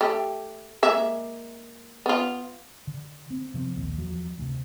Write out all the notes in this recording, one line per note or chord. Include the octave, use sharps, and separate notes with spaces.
A3 G4
G#3 A#3 E5
B3 F4
D3
C4
C3 F3 A#3 C4
A#1 D#2
E2 F3 F#3
D2 C3